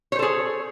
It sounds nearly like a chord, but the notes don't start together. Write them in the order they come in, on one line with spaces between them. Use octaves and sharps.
C#5 C5 A4 G#4